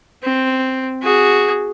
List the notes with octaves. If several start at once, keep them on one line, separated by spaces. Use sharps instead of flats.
C4
F#4 G#4